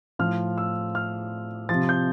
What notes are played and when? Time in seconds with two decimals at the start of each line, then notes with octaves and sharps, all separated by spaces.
0.19 A2 F3 F6
0.58 E6
0.95 F6
1.69 C3 F3 A6
1.89 G6